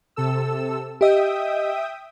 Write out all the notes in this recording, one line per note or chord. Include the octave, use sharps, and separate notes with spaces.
C3 A4 E6
G4 D#5 E5 G5 D#6